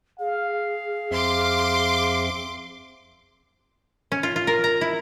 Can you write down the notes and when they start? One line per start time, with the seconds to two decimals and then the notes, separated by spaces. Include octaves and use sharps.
0.20 G#4 F5
1.11 F2 C4 E5 C6 D6
4.12 C#4
4.23 F4
4.36 F4
4.47 A#4
4.64 A#5
4.81 E4